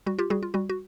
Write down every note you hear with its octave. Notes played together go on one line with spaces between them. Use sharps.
G3 F#4
F4 G4
G3 F#4 G#4
F4
G3 F#4
F#4